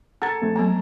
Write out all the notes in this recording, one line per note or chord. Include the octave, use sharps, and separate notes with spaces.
A4 F#5 A#5 G#6
F2 A3
F#3 A#3 B3 A#5